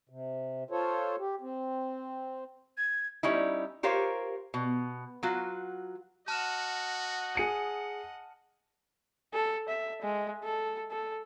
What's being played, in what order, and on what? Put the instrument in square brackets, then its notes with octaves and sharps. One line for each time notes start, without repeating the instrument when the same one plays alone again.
[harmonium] C3
F4 A4 C5 C#5
G4
C4
[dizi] G#6
[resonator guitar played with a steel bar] G3 C#4 D#4 E4
F4 G4 A#4 C5 C#5 F5
B2
F#3 F4 F#4
[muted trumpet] F#4 [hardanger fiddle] D#5 F#5 [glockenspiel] A5 F6 E7
[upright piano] G#4 C#7 D#7
[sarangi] A4
E5
G#3
A4
A4